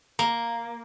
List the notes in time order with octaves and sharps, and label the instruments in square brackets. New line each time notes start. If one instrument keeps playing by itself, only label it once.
[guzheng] A#3 [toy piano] A#5